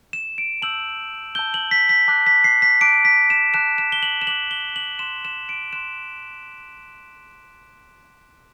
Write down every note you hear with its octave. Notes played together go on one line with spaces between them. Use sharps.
E7
D7
A5 E6 G6 F#7
A5 E6 G6 G7
F#7
B6
B6
A5 D6 F#6
B6
C7
B6
A5 D6 F#6 D7
B6
E7
A5 D6 F#6 E7
E7
G7
F#7
E7
A5 D6 F#6 F#7
G7
F#7
C6 F#6 E7
E7
D7
C6 F#6 E7